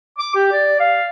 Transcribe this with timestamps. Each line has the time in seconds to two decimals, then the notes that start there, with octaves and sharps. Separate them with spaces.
0.18 D6
0.34 G4
0.52 D5
0.79 F5